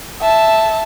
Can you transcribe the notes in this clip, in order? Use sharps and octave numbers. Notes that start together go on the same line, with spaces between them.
E5 A5